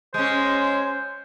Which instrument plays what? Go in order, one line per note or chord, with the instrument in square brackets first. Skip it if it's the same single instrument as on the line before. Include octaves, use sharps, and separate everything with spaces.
[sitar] G#3 C#4 [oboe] C5